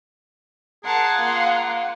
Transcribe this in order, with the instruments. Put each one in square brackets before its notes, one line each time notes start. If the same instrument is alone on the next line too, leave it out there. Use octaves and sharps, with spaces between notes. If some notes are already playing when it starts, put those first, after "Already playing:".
[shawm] G#4 [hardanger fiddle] A#4 A5 [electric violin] F#5 C6
[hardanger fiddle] A#3 F4